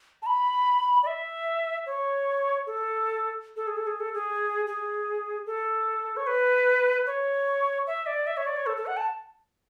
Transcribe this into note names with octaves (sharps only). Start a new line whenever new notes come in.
A5
B5
D5
E5
C#5
A4
A4
G#4
A4
G#4
A4
G#4
G#4
A4
C#5
B4
C#5
E5
D5
E5
C#5
D5
C#5
A4
A4
F#5
A5